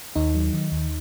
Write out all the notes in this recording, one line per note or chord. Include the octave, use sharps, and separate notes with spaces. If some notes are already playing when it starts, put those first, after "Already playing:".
D#2 D#4
F#3
D#3
D#2